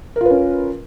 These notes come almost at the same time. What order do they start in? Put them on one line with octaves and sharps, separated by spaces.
A#4 F4 B4 C#4